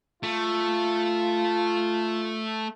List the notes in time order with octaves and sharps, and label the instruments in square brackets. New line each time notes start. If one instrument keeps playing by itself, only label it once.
[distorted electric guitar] A3 [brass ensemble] F4